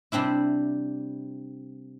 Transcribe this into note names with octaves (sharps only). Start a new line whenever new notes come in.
C3 G3 C4 D4 E4